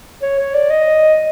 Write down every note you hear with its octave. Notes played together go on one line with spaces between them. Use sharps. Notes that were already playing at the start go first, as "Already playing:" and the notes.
C#5
C#5
D5
D#5